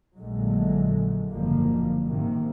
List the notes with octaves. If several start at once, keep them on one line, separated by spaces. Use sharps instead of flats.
A#1 A#2 D3 F#3 G#3 A3
F#1 G#2 D3 F3 G3 A#3
G#2 C3 D#3 A#3